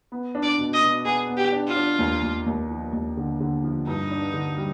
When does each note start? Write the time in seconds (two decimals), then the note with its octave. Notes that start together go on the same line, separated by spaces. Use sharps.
0.12 B3
0.35 D4
0.43 D5
0.58 B2
0.73 D#5
0.82 B2
1.05 B3 G#4
1.29 B3
1.37 G4
1.52 D4
1.67 F4
1.76 D4
1.99 D#2
2.22 D#2
2.46 D#2
2.70 F3
2.93 D#2
3.17 D3
3.40 D3
3.64 F3
3.87 G2 D#4
4.11 D4
4.34 D3
4.58 G3